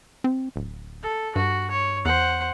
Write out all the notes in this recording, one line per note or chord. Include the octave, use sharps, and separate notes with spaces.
C4
D1
A4
G2 F#4
C#5
E2 C5 F#5